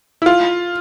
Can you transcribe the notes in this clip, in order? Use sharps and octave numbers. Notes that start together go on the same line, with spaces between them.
E4
F4